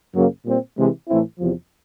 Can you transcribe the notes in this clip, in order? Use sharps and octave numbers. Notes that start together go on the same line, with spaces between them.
F#2 C#3 F#3 A#3
A#2 G3 C4
C3 E3 G#3
A2 E3 A3 C4 E4
E2 C3 F3